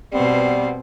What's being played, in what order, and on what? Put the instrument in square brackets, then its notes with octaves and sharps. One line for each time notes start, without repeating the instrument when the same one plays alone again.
[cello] B2 C4 [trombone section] G3 B3